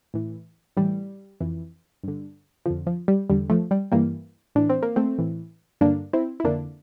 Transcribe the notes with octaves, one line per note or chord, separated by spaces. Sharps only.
A2 E3
A2 E3 G3
F2 E3
G2 D3
F2 D3 F3
F3
G3
E2 D3 G3
F3 A3
G3
G2 E3 G3 A#3
A2 E3 D4
C4
A#3
A3 C4
A2 E3
G2 D3 A#3 D4
C4 E4
E4
F2 D3 A#3 D4